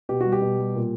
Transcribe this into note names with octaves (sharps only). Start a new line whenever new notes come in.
B2 G4
G3 F#4
G4
B2
G3
A#2